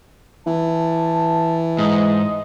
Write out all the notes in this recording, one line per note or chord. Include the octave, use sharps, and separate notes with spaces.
E3 A5
G#2 D#5